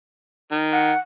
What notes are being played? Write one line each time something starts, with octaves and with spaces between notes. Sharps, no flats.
D#3
F#5